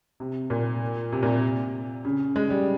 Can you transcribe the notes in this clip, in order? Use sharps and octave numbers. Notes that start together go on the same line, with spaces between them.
C3
A#2
C3
A#2
C3
C#3
G#3
G3